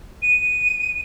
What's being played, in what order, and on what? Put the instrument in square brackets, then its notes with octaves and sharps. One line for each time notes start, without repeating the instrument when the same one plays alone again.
[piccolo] D#7